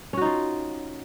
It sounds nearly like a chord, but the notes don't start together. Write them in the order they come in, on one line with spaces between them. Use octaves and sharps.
C#4 F#4 D#4 F4